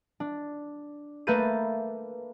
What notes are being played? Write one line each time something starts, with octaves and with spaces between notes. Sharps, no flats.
D4
A3 A#3 B4 G6 A6 D#7